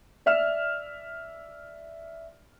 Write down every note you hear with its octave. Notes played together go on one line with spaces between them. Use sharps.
D5 E5 F6 E7